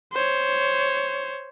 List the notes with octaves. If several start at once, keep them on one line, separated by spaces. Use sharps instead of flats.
C5 C#5